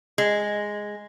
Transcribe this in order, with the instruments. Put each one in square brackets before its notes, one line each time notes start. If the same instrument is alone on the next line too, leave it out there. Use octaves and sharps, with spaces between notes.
[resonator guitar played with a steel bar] G#3